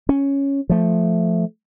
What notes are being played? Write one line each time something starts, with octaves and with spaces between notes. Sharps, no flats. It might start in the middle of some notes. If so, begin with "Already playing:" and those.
C#4
F3 A3